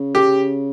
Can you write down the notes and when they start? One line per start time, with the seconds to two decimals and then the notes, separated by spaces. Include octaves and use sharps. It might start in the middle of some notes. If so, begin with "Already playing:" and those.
Already playing: C#3
0.15 G4